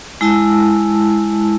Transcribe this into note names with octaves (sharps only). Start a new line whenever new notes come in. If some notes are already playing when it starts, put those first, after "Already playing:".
G#3 E4 A5 E6